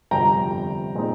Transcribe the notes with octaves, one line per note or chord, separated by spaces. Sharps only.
G1 F2 C3 G3 G5 A#5
A#2 G#3 C4 D#4